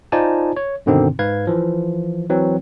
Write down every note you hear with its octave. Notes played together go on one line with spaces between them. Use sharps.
D#4 F4 C5 D5 G#5 A5
C#5
G2 B2 D3 D#3 C4 D#4
G#2 B4 F5 G#6
E3 F3
E3 F#3 C4